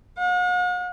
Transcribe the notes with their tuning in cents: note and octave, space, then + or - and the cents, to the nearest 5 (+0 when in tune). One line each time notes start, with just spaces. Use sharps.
F#5 -45